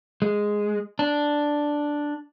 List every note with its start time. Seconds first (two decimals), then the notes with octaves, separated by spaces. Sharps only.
0.22 G#3
0.99 D4